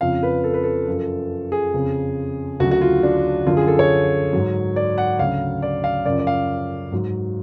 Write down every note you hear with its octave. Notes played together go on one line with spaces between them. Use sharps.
F2 C#3 F3 F5
B4
A4
B4
A4
F#2 F3
G#4
F2 C#3 F3
D2 C#3 F#3 F#4
F#4
F4
D4
F#2 D3 F3 F4
G#4
A4
C#5
G#2 F#3
D5
F#5
D2 C#3 F#3 F5
D5
F5
F#2 C#3 F3 D5
D5
F5
G#2 F#3